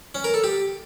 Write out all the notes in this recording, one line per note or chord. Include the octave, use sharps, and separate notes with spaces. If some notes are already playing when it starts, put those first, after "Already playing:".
C#4
A#4
A4
G4